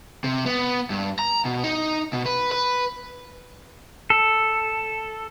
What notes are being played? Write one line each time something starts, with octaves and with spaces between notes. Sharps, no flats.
C3
B3
G2
A#5
B2
D#4
B2
B4
B4
A4